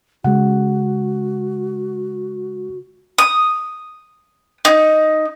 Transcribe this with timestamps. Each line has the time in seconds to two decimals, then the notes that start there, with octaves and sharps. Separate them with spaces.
0.24 C#3 G#3 F#4 F#5
3.18 D#6
4.65 D#4